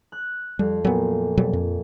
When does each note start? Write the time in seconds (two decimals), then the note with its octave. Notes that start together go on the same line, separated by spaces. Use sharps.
0.12 F#6
0.59 F2 G3
0.85 A#2 F#3 B3
1.37 B2 F#3 G3
1.53 F2